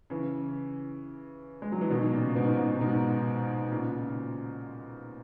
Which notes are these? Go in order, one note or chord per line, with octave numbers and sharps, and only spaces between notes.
C#3 E3
G#3
F#3
E3
B2 D#3
A#2 C#3
G#2 B2
G#2 B2
G#2 B2
A#2 C#3